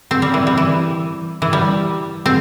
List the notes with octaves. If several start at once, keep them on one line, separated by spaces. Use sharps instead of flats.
C4
G3
E3
G3
E3
E3
G3
C4